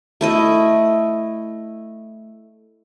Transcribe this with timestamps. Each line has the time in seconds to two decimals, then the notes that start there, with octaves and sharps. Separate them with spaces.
0.21 A3 E4 D#5